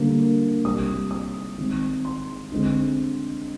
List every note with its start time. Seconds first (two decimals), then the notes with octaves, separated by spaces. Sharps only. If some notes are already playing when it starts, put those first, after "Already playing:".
Already playing: D3 G3 A#3
0.65 C3 G3 C4 D#6
1.11 D#6
1.58 D#3 G#3 C4
2.05 C6
2.52 D3 G#3 C4